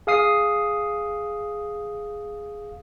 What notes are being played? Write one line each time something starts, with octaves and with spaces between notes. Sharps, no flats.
G#4 F5 D#6 C7